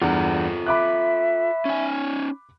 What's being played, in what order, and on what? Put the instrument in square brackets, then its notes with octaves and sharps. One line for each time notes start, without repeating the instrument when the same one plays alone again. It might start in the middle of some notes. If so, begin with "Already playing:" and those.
[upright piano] E2 G2 [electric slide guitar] F4 A4 A#5
[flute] E5 [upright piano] B5 D6 F#6
[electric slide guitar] C#4 D#4 G#5